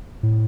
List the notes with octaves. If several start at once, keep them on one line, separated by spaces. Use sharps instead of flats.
A2